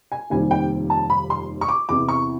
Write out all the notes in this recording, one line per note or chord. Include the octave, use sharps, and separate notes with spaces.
G#5
F1 D#2 D#3 G3 C4 G#5
G5
A5
B5
C6
C#6
D6
E2 C3 E3 D6
C#6